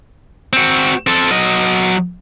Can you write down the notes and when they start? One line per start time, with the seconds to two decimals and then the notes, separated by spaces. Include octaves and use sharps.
0.53 C4 F#4
1.07 C4 A4
1.31 F#3 D#5